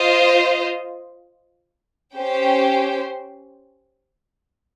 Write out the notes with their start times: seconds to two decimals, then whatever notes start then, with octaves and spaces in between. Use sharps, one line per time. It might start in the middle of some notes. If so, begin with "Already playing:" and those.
Already playing: F4 C5 D#5
2.15 C#4 G4 C5 G5